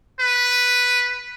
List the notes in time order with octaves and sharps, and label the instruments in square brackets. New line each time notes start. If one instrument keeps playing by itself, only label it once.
[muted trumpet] B4